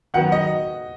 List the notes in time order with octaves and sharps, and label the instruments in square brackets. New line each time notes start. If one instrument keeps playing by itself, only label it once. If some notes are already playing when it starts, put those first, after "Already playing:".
[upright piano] D#3 F#3 B3 F#4 [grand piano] F#5
[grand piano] D#5